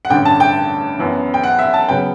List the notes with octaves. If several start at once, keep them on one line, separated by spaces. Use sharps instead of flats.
F#5
A1 G2 D3 G5
A5
G5
F#2 E3 B3
G5
F#5
E5
A5
C#3 F#3 B3 G5